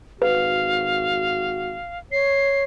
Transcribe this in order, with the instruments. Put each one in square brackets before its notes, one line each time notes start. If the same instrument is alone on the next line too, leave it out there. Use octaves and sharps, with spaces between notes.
[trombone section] G#1 F#4 [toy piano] B4 [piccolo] F5
[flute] C#5 [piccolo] C7